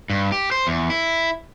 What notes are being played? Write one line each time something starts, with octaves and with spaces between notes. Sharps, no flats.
G2
G4
C5
E2
E4